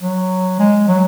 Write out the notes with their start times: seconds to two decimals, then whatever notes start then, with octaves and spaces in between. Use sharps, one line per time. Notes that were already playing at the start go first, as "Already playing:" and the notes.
0.01 F#3
0.59 G#3
0.88 F#3